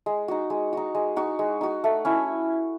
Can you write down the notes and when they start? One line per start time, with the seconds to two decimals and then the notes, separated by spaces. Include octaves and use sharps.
0.06 G#3
0.28 D#4 F#4
0.50 G#3
0.73 D#4 F#4
0.95 G#3
1.16 D#4 F#4
1.39 G#3
1.61 D#4 F#4
1.84 A3
2.05 C#4 E4